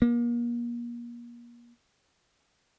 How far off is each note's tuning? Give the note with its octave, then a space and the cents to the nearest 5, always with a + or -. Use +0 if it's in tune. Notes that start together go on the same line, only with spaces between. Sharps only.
A#3 +35